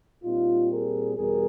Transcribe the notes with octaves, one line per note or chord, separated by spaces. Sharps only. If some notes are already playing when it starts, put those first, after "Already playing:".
A#2 G3 C4 D#4 F4
G#4 A#4
E2 B2 G3 G#4 A#4